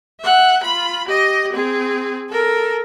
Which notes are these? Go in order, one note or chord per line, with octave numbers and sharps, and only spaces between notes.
E5 F#5
F4 B5
G4 D#5
C4 G#4
A4 A#4